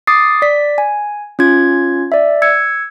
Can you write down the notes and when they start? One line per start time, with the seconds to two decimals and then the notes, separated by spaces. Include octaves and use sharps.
0.07 D6 D#6 A6 C7
0.42 D5 B6
0.78 G#5
1.39 C#4 F4 G#6
2.12 D5 E5
2.42 E6 G#6 C#7